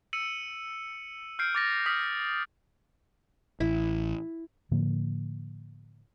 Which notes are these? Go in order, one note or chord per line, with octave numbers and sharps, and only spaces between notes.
E6 C#7 D#7 F#7
F6 G6 C7 D7
D6 A6 A#6
D#6 F6 A#6 B6
A1 E4
A2 D3 F3 A#3